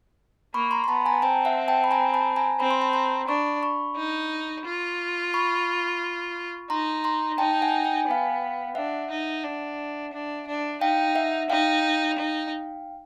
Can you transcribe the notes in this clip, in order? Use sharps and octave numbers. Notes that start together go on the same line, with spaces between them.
A#3 B5 C#6
A#5 C6
C6
B3 A5 B5
G#5 A#5
C4 G5 A5
E5 F#5
G5 A5
B5
G#5 A#5
A5 B5
G#5 A#5
C4 B5
C6
A5 B5
A#5 C6
D4 B5 C#6
B5 C#6
D#4
F4
B5 C#6
D#4 A#5 C6
A#5 C6
D#4 G5 A5
G5
F#5 G#5
G5
G#5
B3 F5 G5
D4 E5 F#5
D#4
D4
D4
D4
D#4 F5 G5
E5 F#5
D#4 F5 G5
D#4